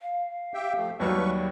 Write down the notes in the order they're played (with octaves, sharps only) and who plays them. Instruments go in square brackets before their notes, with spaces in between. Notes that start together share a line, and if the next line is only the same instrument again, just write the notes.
[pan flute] F5
[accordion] G4 E5 G5
F3 A3
[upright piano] D#2 F#3 G3 [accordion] B4 C#6